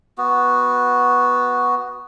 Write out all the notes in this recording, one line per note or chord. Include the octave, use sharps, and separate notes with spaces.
B3 F#4